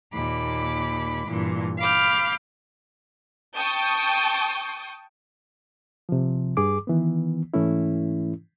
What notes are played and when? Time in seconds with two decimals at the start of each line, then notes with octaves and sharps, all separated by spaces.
0.14 D#2 A#2 B5 D6
1.27 G2 A#2 E3
1.79 F5 B5 D6 F6 G6
3.57 G5 A5 C#6 D#6 G6
6.09 C3 F3
6.57 G2 G#4 D6
6.87 D#3 E3 B3
7.54 G#2 E3 A3 C#4 E4